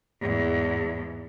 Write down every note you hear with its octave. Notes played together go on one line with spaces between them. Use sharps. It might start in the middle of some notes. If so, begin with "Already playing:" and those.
E2 G#2